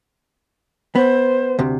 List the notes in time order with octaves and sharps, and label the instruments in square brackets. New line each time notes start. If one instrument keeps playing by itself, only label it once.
[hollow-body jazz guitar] B3 [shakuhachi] C5
[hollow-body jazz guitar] D2 C3